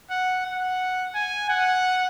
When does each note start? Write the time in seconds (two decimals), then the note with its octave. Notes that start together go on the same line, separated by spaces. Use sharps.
0.10 F#5
0.46 F#5
1.15 G#5
1.49 F#5